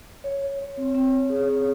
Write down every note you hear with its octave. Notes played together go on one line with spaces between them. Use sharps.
C#5
C#5
C#5
C4
C4
C4
G#4
C#5